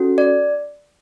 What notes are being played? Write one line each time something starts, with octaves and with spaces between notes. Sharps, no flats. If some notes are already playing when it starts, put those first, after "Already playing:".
Already playing: C#4 F#4 A4
D5